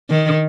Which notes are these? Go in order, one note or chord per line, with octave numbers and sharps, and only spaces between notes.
D#3